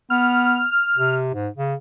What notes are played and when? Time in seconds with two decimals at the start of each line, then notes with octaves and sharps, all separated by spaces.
0.10 B3 F6
0.95 C3
1.34 G#2
1.56 C#3